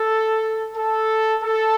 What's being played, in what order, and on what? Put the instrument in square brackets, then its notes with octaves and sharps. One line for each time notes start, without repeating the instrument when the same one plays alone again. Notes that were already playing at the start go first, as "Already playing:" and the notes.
Already playing: [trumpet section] A4
A4
A4